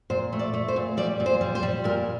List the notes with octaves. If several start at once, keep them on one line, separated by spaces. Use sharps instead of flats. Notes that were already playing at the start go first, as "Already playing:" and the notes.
A#2 C5
A3
D5
A3
C5
A#2
G3 D5
A#2
C5
G3
C5
G3
A#2 A#4